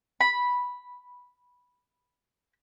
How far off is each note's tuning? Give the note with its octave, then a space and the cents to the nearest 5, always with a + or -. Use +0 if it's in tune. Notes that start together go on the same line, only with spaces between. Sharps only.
B5 -5